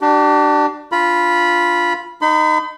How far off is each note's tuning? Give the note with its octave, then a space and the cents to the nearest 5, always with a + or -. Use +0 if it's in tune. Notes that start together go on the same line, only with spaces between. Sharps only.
D4 +20 G4 -35
D4 -5 F4 +0 B5 -10
D#4 -10 B5 +40